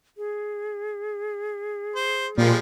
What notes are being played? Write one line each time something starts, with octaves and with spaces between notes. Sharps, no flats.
G#4
C5
A#2 F3 G3 G#3